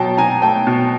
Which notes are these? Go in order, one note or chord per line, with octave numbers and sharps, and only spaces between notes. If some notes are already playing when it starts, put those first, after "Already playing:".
Already playing: B2 F#3 G5 A5 A#5
B2 G#5 A#5
A3 G5 A5
B2